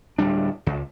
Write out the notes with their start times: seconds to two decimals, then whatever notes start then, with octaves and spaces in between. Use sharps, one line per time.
0.18 D1 G3 D4
0.66 C#2